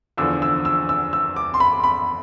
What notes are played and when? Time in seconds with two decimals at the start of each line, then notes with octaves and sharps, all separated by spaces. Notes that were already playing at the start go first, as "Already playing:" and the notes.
0.17 E2 D3 F3 E6
0.42 E6
0.65 E6
0.89 E6
1.13 E6
1.36 D6
1.54 C6
1.60 B5
1.84 B5